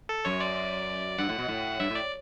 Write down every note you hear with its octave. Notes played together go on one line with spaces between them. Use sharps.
A4
F#2 C#5
D5
G2 F#5
A2
B2
A2
G2 E5
A2
D5